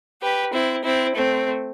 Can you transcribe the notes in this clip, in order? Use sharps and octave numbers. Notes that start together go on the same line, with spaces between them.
G4 B4
C4 E4
C4 E4
A3 C4